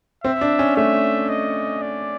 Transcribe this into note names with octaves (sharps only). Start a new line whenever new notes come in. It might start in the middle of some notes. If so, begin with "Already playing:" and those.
C4 E5
D4
C#4
A3 E5
D#5
D5